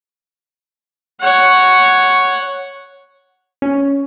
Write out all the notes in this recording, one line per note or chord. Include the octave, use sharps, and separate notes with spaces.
C#5 F#5
C#4